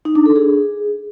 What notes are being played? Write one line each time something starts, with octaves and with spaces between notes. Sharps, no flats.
D#4
D4
A4
G#4